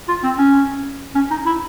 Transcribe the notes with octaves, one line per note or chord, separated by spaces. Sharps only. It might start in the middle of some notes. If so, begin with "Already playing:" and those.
F4
C4
C#4
C#4
D#4
E4